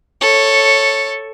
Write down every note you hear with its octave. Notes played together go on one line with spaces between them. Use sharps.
A4 C#5